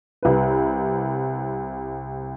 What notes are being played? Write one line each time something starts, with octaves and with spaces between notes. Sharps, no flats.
C2 B4